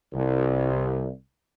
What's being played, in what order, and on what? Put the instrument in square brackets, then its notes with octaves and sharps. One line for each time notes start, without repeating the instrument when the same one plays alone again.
[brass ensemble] C2